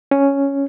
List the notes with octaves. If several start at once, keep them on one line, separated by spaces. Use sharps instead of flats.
C#4